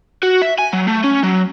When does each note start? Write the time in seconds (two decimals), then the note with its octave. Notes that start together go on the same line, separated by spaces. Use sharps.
0.23 F#4
0.42 E5
0.59 G#5
0.73 F#3
0.88 A3
1.04 C#4
1.23 F#3